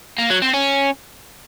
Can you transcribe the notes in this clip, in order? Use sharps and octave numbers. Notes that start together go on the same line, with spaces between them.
A#3
F#3
C4
C#4